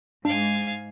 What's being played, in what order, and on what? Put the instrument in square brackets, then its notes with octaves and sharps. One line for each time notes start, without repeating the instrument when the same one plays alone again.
[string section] G#2 [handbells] D4 [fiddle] F5 G#5